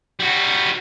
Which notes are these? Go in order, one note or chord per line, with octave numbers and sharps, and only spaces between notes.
G3 F#4